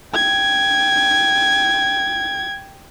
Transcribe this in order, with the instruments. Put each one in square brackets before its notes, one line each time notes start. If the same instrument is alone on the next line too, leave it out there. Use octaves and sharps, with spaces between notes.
[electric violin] G5 G#6